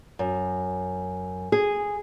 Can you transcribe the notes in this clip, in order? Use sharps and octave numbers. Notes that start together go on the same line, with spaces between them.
F#2
G#4